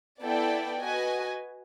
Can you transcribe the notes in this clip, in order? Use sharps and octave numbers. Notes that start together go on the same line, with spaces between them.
B3 E4 A4 D5 G5
F#4 B4 D#5 G#5